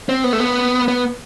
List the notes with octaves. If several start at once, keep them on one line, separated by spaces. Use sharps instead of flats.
C4
B3
A3
B3
B3